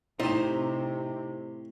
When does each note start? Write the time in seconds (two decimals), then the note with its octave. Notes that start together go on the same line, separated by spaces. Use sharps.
0.20 A2 C3 D#4 G4 C5